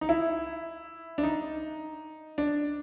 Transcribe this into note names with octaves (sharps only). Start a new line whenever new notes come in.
D#4
E4
D4
D#4
D4